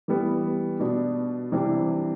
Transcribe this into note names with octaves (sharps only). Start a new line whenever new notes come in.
E3 G3 B3
B2 B3 D4
C3 E3 G3 D4